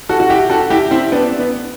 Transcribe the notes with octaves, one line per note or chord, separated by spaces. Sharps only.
F#4 A4
F#4
E4 G4
F#4 A4
E4 G4
C4 E4
B3 D4
B3